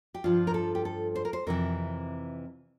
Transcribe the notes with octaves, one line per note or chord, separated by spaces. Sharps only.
G4
G2 F3 F4
A#4
A4
G4
A4
C5
A#4
C5
F2 C3 E3 A#4